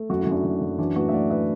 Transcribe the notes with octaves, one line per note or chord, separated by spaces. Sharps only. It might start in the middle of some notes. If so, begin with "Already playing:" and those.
Already playing: A3
F#2 F#4
E4
F#2
D4 F#4
F#2
F#2
E3 D4 F#4
A2 F#4 B4
E5
A2 D5 F#5
B4 E5